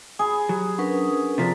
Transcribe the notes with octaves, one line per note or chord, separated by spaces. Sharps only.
G#4 G#5 B5
F#3 G4
C#4 D4 A#4 B4 F#5 C#6
C3 F3 D4 A4 A#5 A6 B6